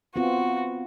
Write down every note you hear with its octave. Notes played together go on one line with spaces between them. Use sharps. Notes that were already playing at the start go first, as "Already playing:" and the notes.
B3 C4 F4 F#4